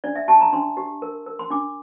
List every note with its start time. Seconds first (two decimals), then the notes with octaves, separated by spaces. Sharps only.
0.04 D4 D5
0.15 E5
0.28 G4 A5
0.41 A#5
0.53 D4 C6
0.77 G4
1.02 A#4
1.26 A#4
1.39 C6
1.50 D4 D6